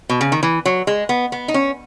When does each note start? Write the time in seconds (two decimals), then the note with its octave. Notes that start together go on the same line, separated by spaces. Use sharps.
0.09 B2
0.21 C#3
0.32 D#3
0.43 E3
0.65 F#3
0.87 G#3
1.09 B3
1.32 B3
1.48 D#4
1.54 C#4